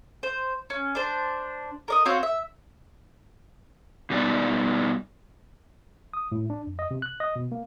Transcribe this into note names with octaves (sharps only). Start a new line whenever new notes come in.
C5
C#4
D4 C5
A#4 D5 D#5
C4 F#4 C#5 F5
E5
B2 G3 B3 D#4 D5
D#6
A2
D4
F2
D#5
C3
F#6
D#5
B2
A#3